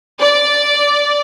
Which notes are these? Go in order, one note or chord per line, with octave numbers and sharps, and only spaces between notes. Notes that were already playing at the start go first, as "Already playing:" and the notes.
D5